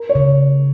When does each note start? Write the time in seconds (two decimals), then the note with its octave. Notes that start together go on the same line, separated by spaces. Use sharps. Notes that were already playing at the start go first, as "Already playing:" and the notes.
Already playing: A#4
0.09 C#5
0.15 C#3